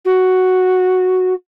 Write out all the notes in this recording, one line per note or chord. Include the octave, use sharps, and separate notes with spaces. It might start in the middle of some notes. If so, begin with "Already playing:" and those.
F#4